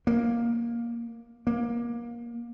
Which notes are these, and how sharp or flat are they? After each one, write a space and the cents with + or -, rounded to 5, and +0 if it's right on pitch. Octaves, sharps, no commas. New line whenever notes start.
A#3 +10
A#3 +25